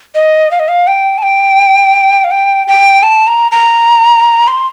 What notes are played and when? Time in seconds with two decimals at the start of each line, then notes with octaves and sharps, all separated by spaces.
0.15 D#5
0.51 F5
0.59 D#5
0.68 F5
0.87 G5
1.18 A5
1.23 G5
2.24 F5
2.31 G5
2.67 G5
3.03 A5
3.27 A#5
3.52 A#5
4.48 C6